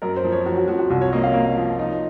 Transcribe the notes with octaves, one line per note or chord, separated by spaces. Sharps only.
F#2 A#4
C5
F3
C#5
F3 F#4
F#4
F3 F#4
F#4
C2 F#4
C#5
A#3 D#5
F5
A#3
F3
D#4